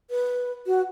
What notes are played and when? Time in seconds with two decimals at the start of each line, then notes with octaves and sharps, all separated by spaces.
0.10 B4
0.67 F#4